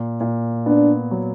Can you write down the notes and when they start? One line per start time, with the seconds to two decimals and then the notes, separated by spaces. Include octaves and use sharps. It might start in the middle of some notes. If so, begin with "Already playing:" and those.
Already playing: A#2
0.21 A#2
0.66 B3 D4
1.11 F#3